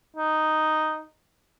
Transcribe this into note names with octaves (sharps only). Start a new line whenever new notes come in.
D#4